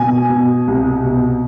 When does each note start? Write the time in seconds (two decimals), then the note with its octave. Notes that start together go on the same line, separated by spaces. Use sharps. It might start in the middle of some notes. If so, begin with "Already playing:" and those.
Already playing: B2 G#5
0.30 B2
0.67 C2
1.04 B2